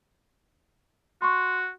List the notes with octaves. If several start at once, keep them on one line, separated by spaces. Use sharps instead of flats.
F#4 C6 C#6